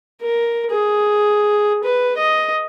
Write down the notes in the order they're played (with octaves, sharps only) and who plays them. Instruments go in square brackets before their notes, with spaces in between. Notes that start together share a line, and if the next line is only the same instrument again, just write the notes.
[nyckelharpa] A#4
G#4
B4
D#5